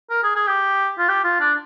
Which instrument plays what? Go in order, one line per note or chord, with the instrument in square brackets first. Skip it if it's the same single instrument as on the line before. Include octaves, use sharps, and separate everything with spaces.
[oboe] A#4
G#4
G#4
G4
F4
G4
F4
D4